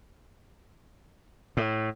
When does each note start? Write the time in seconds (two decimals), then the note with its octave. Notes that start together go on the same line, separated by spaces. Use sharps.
1.57 A2